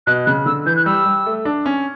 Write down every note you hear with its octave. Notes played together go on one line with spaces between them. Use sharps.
B2 F#6
C#3 F#6
D3 E6
E3 G6
F#6
G3 E6
G3
A3
D4
C#4